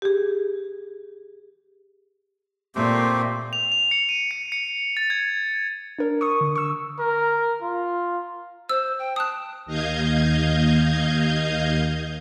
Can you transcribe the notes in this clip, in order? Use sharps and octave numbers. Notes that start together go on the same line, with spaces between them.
G4 G#4
A#2 A3 C4 G4
F7
F7
C#7
D#7
C#7
C#7
A6
G#6
D4 A#4
C#6 D#6
D3
C#6 E6
A#4
F4
C5 E6
G5
A5 D#6 F#6
D#2 D#5 F5 G6 G#6